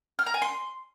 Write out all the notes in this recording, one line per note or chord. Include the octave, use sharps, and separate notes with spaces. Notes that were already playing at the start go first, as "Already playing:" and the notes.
F6
A#5
G#5
C6